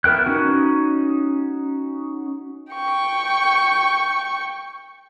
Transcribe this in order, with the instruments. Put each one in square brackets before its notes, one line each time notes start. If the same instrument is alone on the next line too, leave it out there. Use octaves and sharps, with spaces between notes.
[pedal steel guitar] B3 E4 A#4 G5 F#6
C#4 D#4 F#4
[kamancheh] G5 C#6